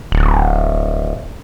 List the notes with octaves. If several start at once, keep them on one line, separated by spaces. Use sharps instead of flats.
D1